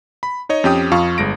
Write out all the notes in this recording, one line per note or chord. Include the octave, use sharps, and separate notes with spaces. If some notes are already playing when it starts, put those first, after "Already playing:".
B5
D#4 C#5 D#5
F2 C#4 G4 G5 D#6
F2 F4 F5 C#6
G1 G#3 A#6 D7